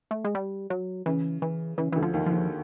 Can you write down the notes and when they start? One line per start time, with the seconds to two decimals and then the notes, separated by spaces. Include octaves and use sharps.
0.11 A3
0.24 G#3
0.35 G3
0.70 F#3
1.06 C#3 E3
1.42 E3
1.78 C#3 E3
1.92 D2 D3 E3
2.02 F3
2.13 D#2 D#3
2.26 F3
2.32 D#2 D#3